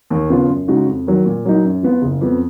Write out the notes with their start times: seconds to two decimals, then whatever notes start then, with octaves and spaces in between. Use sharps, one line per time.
0.10 D#2
0.30 C#3 F3 B3 F4
0.49 F#2
0.68 C#3 G#3 D#4 F#4
0.87 F2
1.07 D#3 F#3
1.26 A#2
1.45 F#3 A#3 D#4
1.64 F#2
1.83 F3 B3 F4
2.02 F#1
2.21 F2 F3 B3